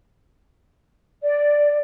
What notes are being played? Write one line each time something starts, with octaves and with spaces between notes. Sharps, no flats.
D5